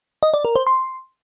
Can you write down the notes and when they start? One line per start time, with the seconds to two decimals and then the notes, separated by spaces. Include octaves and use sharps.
0.23 D#5
0.34 D5
0.45 A#4
0.56 C5
0.67 C6